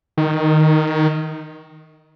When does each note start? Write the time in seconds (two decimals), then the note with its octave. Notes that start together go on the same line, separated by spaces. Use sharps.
0.17 D#3